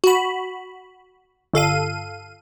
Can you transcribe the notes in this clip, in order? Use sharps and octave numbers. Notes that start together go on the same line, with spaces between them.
F#4 B5
G1 A4 F5 D#7